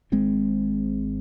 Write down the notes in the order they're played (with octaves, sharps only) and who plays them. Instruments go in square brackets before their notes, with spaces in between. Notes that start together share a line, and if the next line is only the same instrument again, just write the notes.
[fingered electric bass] G#1 G#2 G#3 C4